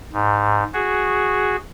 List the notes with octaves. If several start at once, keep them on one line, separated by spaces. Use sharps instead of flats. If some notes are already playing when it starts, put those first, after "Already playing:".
G#2
F#4 G#4